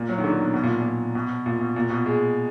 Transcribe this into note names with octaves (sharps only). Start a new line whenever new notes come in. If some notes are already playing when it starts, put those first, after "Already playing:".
Already playing: A#2
F#3
D#3
D3
B2
B2
A#2
A#2
B2
A#2
B2
A#2
B2
G#3